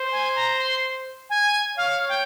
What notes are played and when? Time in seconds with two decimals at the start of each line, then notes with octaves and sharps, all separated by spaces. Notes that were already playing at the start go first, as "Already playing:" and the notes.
Already playing: C5
0.12 G#5
0.36 A#5
0.59 C6
1.30 G#5
1.77 C#5 F5
2.09 G5